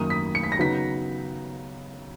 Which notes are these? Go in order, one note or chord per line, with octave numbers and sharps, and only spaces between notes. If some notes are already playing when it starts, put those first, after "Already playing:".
Already playing: F#2 D#3 A#3 D#4 D#6
B6
C#7
B6
A#6
C#3 F#3 B3 D#4 B6